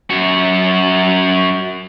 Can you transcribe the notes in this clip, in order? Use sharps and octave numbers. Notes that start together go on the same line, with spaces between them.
F#2 F#4